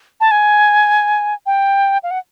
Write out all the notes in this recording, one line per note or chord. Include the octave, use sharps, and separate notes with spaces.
A5
G#5
G5
F5
F#5